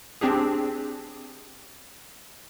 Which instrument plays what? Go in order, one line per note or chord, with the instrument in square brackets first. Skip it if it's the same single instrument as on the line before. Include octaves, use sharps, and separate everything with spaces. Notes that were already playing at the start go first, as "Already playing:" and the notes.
[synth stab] C4 D4 G4 G#4